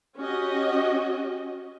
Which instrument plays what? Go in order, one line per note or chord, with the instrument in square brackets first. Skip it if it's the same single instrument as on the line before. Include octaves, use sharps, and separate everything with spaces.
[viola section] C#4 F#4 G4 D#5